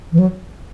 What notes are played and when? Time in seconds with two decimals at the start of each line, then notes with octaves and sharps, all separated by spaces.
0.12 E3
0.19 F#3